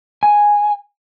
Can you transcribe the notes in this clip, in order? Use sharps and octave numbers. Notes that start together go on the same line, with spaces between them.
G#5